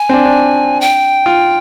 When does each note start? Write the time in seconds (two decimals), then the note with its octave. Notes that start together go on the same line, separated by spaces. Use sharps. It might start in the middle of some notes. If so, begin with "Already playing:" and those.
Already playing: G#5
0.09 C4
0.13 D4
0.25 D4
0.81 G5
1.26 F4